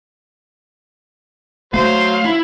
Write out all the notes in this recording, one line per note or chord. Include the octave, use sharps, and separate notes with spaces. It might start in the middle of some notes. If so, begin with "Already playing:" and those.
F#3 A3 C5 F5
E4